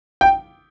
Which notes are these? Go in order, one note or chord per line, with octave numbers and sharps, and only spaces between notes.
G5